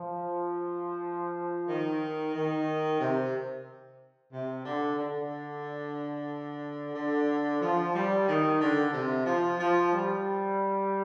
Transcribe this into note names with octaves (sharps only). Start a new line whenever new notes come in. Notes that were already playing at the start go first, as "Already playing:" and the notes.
Already playing: F3
D#3
D#3
C3
C3
D3
D3
D3
F3
G3
D#3
D3
C3
F3
F3
G3